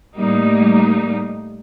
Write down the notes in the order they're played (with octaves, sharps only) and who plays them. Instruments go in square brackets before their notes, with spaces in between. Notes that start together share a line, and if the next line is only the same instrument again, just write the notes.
[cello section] A2 G3 A#3 D#4